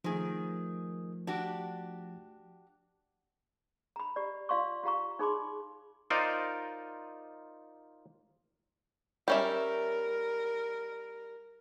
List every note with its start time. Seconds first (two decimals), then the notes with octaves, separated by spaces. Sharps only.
0.04 D#3 F3 A3 G#4
1.27 D4 F#4 G4
3.96 A#5 B5
4.16 G4 D5
4.49 F4 D5 F5 C6 C#6
4.83 F4 G4 F5 A#5 C#6
5.19 D#4 G#4 B5 C6 D6
6.10 D#4 F4 A#4 C5 D5 D#5
9.28 G3 C#4 A#4 E5